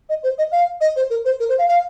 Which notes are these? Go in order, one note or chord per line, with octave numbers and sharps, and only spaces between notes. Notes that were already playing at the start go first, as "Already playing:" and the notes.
D#5
C5
D#5
F5
D#5
C5
A#4
C5
A#4
C5
F5
F5